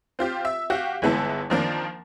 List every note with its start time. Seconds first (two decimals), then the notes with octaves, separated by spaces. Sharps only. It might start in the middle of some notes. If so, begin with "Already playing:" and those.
0.19 C4 F4 G4
0.45 E5
0.70 F#4 G4 F5
1.02 G1 E3 G#3 B3 E4 A5
1.50 D#3 F3 A#3 D4